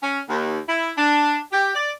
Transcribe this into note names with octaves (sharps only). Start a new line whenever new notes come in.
C#4
D#2
E4
D4
G4
D5